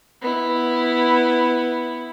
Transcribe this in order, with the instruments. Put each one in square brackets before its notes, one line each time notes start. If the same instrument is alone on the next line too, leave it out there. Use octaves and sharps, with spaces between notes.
[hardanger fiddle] B3 E4